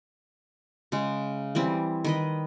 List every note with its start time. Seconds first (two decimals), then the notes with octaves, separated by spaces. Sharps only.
0.92 C#3 G#3
1.55 E3 G3 C4
2.05 D#3 B4 D#5